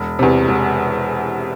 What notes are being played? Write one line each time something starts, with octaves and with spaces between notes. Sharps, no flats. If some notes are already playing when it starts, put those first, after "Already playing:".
Already playing: E1
E2 C3
E1